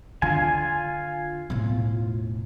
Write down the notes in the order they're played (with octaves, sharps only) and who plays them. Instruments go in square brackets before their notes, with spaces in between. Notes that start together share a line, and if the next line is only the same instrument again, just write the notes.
[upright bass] D3 [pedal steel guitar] F4 G#5
[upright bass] E1 A2